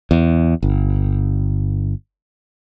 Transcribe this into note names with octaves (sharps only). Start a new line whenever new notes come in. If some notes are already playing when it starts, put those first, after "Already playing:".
E2
G1